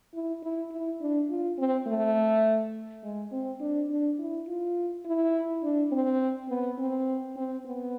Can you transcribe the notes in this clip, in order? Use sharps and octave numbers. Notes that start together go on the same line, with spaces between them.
E4
E4
E4
D4
F4
C4
A3
G#3
C4
D4
D4
E4
F4
E4
D4
C4
B3
C4
C4
B3